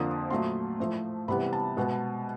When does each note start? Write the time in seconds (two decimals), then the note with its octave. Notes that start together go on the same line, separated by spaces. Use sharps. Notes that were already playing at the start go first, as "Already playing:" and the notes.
Already playing: F2 D3 F3 A#3 D#6
0.30 A#2 F#3 A3 C6
0.79 A2 F3 A3
1.28 C3 E3 G3 B3 B5
1.53 A5
1.77 B2 G#3 B3